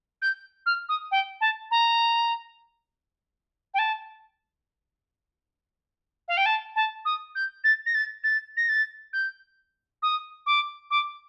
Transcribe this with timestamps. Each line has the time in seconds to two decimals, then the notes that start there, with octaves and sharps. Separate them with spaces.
0.22 G6
0.66 F6
0.89 D#6
1.11 G5
1.41 A5
1.71 A#5
3.74 G5
3.79 A5
6.28 F5
6.37 G5
6.46 A5
6.76 A5
7.05 D#6
7.35 G6
7.64 A6
7.86 A#6
7.94 A6
8.24 A6
8.57 A#6
8.69 A6
9.13 G6
10.02 D#6
10.46 D6
10.91 D6